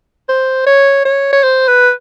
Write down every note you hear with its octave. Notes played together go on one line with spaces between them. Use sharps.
C5
C#5
C#5
C#5
C5
B4